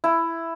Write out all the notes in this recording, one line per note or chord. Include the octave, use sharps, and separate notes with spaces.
E4